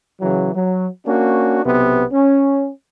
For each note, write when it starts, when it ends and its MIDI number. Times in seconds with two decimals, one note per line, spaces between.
0.21 0.55 49
0.21 0.55 52
0.21 0.55 54
0.55 0.87 54
1.07 1.61 58
1.07 1.61 61
1.07 1.61 62
1.07 1.61 66
1.66 2.04 35
1.66 2.04 48
1.66 2.04 59
2.12 2.69 61